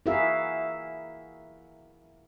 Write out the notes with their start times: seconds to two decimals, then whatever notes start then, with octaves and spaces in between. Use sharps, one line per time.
0.06 E4 F#4 G#4 A#4 E5 F5